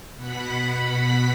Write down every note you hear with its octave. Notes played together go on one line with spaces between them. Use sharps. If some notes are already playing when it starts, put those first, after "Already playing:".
B2 F#5 B5 B6